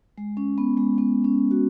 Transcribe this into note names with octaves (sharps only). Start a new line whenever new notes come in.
G#3
C#4
B3
G#3
B3
C#4
F#4